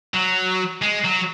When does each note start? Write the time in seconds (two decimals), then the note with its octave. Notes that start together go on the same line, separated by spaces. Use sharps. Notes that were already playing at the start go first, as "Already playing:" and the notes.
0.14 F#3
0.82 G#3
1.05 F#3